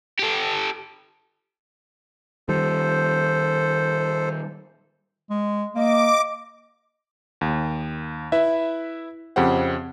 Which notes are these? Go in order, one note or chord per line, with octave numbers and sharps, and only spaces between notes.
G4 A4
D#3 G3 A4 C5
G#3
A#3 D#5 D6
D#2
E4 B4 E5
F2 C#3 G4 C5 F#5